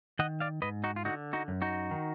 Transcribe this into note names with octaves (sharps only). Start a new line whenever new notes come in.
D#3 D#5 F#5
D5 F5
G#2 B4 D#5
D#4 F#4
F4
D3 D#4 F#4
D#4 F#4
F#2
D#4 F#4
D#3